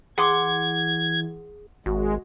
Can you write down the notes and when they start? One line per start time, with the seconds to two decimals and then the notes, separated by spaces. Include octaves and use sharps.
0.18 E3 G#4 F#5 C6 D6 G#6
1.86 G#1 G#3 F#4